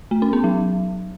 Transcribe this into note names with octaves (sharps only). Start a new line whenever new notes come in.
A3
C#4
B3
F#3